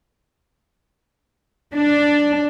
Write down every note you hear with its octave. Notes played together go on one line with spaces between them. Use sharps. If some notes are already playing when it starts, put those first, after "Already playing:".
D4